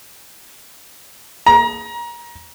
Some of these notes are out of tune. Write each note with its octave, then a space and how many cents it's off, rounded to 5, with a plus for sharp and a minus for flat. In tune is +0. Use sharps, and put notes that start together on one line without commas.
A#5 +25